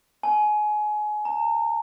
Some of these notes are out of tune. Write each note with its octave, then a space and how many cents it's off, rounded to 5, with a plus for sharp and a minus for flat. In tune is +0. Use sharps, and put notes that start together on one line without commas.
G#5 +25
A#5 -35